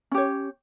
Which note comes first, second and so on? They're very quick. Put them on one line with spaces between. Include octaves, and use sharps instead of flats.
C#4 G4 C#5